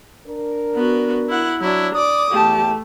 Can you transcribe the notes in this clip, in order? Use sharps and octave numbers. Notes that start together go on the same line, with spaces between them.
D4 A#4
B3 F#4
E4 F#5
F#3 D4 E4
D5 D6 D#6
E2 A3 G4 A5